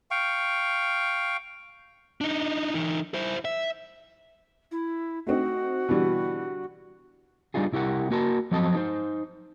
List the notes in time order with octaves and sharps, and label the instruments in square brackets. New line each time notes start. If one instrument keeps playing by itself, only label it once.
[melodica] F5 G5 C#6
[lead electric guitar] D4 D#4
E3 D#4
E4 C5
E5
[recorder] E4
[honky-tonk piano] A3 C4 D#4 [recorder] F#4
[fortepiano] B2 E3 [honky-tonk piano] D3 G3
[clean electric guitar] G3 D4 D#4 F4 G#4
C2 E4 G4 A#4 F#5
A#3 F#4 A#4 A5
F3 F#3 C4 A4 D#5 A5
D#4 C5